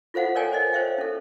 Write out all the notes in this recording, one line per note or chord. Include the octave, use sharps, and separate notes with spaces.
F4 A4 C5 F5 F#5
A4 A#4 C#5 D5 G5 G#5
C5 D5 D#5
C5 C#5 E5 F5 G5
C#4 A4